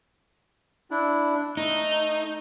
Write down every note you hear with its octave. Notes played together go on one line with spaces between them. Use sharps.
D4 E4
A3 D#4